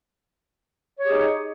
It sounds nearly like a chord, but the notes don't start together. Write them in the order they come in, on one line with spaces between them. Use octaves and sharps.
C#5 G4 G#4 D#4